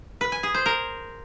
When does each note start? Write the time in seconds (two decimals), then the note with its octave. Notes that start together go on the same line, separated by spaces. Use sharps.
0.21 B4
0.32 G#5
0.43 G#4
0.54 C5
0.66 A#4